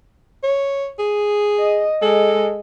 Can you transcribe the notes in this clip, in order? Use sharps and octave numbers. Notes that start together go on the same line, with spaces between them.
C#5
G#4
D#5
G#3 A4